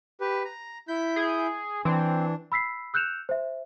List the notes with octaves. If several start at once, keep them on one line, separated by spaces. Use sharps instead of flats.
G4 B4
A#5
E4 G6 B6
G#4
E3 C4 D4
B5 E6 B6 C7
E6 F#6 G6 C#7 E7 F7
C5 E5